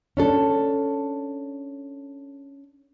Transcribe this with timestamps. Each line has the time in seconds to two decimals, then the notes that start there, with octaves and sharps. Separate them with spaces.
0.17 C#4 D4 A4